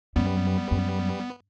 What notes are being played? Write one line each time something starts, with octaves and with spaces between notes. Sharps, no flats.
F#2 G3 B3
F#2